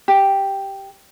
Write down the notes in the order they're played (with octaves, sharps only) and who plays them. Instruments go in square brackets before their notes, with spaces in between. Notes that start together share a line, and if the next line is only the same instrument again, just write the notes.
[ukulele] G4